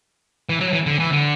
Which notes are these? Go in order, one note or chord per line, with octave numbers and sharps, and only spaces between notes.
E3
F#3
E3
D3
E3
D3